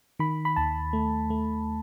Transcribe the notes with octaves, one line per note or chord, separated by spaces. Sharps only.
D#3 B5
B5
D#2 A5
A3
A3